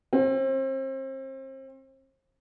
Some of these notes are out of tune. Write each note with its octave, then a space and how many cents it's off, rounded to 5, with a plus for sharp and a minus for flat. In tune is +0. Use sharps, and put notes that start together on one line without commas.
C4 +35